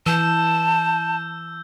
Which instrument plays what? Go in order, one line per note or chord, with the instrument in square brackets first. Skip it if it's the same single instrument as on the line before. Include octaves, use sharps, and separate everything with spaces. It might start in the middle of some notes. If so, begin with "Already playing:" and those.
[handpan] E3 [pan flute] A5 [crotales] E6 G6